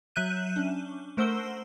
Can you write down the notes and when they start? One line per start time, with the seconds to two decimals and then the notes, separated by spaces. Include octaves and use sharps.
0.16 F#3 E5 F#6 G6 D#7
0.56 C#4 D4
1.17 A3 A#4 C5 F#5 E6 G7